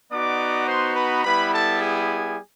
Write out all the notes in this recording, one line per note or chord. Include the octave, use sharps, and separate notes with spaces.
B3 D#4 F#4 D5 D6
C5 C6
B4 B5
G3 B3 E4 B4 B5
A4 A5
G#4 G#5